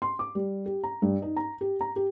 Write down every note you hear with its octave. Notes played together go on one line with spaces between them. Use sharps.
C6
D6
G3
G4
A#5
G2
D#4
A#5
G4
A#5
G4